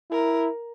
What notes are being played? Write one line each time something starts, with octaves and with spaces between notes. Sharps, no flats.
E4 A#4